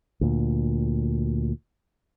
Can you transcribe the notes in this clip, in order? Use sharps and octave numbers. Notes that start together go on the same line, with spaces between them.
D2 A#2